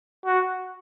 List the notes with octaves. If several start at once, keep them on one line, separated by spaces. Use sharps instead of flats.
F#4